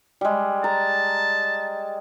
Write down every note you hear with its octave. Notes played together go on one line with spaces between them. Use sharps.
G3 G#3
A5 A#5